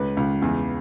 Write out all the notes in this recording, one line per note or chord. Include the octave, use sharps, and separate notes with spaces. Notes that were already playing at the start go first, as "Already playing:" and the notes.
Already playing: C#2 B4
C#2
E2